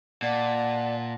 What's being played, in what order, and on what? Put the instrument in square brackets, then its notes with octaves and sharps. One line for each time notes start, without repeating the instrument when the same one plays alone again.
[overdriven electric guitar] A#2 [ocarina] D5 [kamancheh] F#5 A5